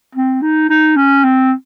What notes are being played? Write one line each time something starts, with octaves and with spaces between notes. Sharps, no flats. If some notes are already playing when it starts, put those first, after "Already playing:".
C4
D#4
D#4
C#4
C4